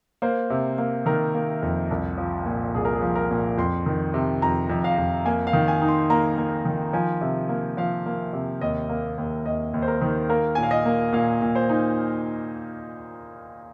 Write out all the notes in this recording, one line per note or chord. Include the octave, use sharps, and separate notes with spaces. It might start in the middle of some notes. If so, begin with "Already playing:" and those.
A#3 C5
C3
A#3
D#3 A#4
A#3
F2
C2
F3
A#2
C2 G#4
A#4
G#4
F3
A#4
A#2
F2 C6
D#3
C3
F2 A#5
F2
F5
F2
A#3 G#5
F5
D#3
G#5
D#4
C6
A#3 A#5
A#3
D#3
F3 G#5
C3
A#3
F3 F5
A#3
C3
D#2 D#5
A#3
D#2
D#2 D#5
D#2
C5
A#4
D#3
A#3 A#4
A#2 G#5
F5
D#5
A#3
A#2 F5
A#2
C5
D#4